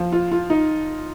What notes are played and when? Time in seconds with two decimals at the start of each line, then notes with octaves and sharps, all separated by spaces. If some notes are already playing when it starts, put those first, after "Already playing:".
Already playing: F3
0.13 F4
0.32 F4
0.50 D#4